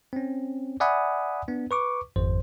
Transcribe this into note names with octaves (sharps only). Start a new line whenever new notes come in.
C4 C#4
D5 E5 F#5 G#5 B5 D#6
B3 D4
B4 C#6 D6
G#1 F2 C5